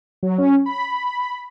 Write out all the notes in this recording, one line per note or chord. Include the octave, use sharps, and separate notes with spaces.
F#3
C#4
B5